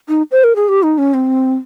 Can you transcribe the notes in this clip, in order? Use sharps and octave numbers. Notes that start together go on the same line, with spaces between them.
D#4
C5
A#4
G#4
G4
D#4
C#4
C4